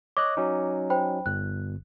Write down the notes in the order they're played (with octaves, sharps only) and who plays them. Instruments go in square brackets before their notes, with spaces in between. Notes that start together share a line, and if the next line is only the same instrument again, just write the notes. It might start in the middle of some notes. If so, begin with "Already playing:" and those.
[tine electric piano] C#5 D#5 F#6 [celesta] D6
[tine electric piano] F#3 C#4 D#4
[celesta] C5 G5 B5
[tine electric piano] G1 [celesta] F#6